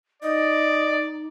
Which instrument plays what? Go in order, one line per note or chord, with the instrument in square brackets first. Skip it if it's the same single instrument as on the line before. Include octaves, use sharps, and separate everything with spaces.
[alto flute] D#4 [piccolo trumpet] D5 [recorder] D#5